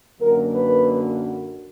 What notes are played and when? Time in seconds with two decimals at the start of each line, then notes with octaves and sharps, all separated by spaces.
0.20 F#2 D3 F#3 A#3 A#4
0.53 B4